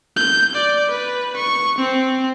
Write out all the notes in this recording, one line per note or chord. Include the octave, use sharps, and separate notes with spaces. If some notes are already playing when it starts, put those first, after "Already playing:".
G6
D5
B4
C#6
C4